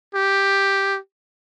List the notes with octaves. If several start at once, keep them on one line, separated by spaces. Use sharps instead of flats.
G4